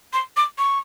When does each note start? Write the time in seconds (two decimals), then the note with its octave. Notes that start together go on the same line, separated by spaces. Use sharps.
0.13 C6
0.37 D6
0.59 C#6